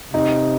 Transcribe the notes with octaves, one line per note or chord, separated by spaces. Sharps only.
C3 D#4